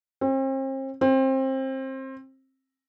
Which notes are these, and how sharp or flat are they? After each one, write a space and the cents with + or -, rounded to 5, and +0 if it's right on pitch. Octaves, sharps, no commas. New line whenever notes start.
C4 +40
C4 +25